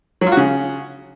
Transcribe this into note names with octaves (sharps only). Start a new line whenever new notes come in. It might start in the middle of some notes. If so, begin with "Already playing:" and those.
F#3
F4
F#4
C#3